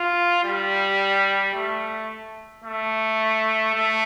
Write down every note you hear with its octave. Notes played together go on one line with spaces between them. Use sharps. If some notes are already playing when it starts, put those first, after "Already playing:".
Already playing: F4
G3
A3
A3
A3